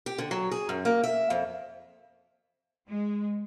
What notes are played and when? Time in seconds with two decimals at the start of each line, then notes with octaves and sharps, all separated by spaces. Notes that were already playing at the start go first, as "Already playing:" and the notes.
0.06 G4
0.18 D3
0.31 F#3
0.51 G#4
0.69 F#2
0.85 A#3
1.03 E5
1.30 F2
2.88 G#3